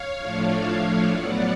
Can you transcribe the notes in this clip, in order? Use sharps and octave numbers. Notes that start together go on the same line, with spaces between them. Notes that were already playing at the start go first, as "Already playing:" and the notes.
Already playing: C#5 F5
A2 F3 A3 D4
A2 F#3 B3 D5 F#5